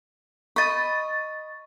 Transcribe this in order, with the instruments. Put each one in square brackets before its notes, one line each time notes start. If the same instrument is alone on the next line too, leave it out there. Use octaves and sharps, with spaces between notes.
[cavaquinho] D#5 B5 [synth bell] C#6 A6